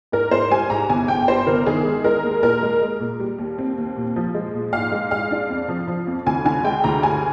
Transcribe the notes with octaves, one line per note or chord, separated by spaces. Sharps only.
G#2 A#4
G#2 C5
G3 G#5
G#2 A#5
G1 G#5
G1 G5
G2 C5
G1 A#4
D#3 G#4
G#3
G#3 A#4
D#2
A#2 A#4
G#3
G#3
A#2
G3
D#2
C4
D#2
A#2
F3
G#3
A#2
G#2 F5
G#3
G#3 F5
D4
F2
F3
F3
F2
D2 G#5
D3 G#5
G#3 G5
D2 A#5
G2 G#5